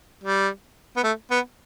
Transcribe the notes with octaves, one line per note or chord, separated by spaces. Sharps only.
G3
B3
A3
B3